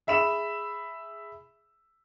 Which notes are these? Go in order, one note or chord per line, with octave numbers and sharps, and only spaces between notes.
G#4 E5 B5 E7